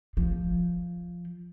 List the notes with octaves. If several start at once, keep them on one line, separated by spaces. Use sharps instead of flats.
F3